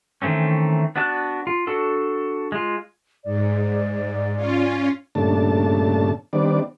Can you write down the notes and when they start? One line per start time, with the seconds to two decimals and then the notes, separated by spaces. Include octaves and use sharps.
0.22 D#3 E3 A3 C4 C#4
0.96 B3 D4 F#4 A5 F#6
1.47 F4
1.67 D4 F#4 A4
2.52 G#3 F4
3.24 G#2 D5
4.35 C#4 F4
5.15 G2 A#2 C#3 A3 D4 A5
6.33 D#3 G3 B3 C4 D4 D5